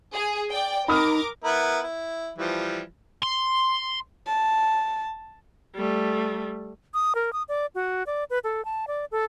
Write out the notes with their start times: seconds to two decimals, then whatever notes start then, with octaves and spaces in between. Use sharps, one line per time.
0.14 G#4
0.51 D5 G5
0.88 D#4 A#4 B5 D6 D#6 F6
1.44 B3 E4 A#4
1.82 E4
2.38 E3 F3 G3
3.23 C6
4.27 A5
5.75 G3 A3
6.94 D#6
7.15 A#4
7.33 D#6
7.49 D5
7.75 F#4
8.07 D5
8.30 B4
8.44 A4
8.65 A5
8.87 D5
9.12 A4